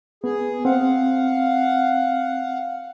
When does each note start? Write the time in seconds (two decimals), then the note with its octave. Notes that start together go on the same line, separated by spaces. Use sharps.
0.24 B3 G#4
0.65 C4 F5 F#5